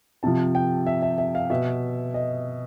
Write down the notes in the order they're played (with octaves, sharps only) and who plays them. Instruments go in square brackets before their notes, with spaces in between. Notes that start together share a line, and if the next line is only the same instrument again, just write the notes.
[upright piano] C3 F3 A5
G5
E5
E5
E5
F5
B2 E5
D#5